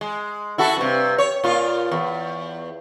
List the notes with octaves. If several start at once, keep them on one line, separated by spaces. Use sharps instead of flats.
G#3
E4 F#4 A4
G2 C3
C#5
A#2 F4
E2